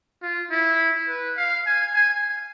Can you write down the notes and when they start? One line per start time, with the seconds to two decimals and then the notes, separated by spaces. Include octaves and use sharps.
0.22 F4
0.51 E4
1.08 B4
1.37 F5
1.66 G#5
1.95 G#5